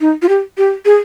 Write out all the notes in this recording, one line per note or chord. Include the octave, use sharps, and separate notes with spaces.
D#4
F4
G4
G4
G#4